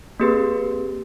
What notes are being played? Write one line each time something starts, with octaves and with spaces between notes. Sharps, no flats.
A#3 C4 G4 G#4 B4